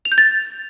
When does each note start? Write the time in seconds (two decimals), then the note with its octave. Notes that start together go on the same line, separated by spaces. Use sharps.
0.05 F7
0.12 G6
0.18 A6